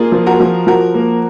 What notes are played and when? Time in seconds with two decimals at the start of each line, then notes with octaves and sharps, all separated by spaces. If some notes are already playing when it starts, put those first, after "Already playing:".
Already playing: A#3 F4 G#4 A#4 D5
0.12 F3
0.26 F#4 A#4
0.40 F3
0.67 F3 F#4 A#4
0.94 A#3